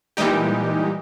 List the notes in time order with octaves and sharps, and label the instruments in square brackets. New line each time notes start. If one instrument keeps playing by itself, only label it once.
[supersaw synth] A#2 E3 G3 G#3 D#4 G4